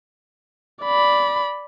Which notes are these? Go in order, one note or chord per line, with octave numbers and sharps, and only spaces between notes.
D5 B5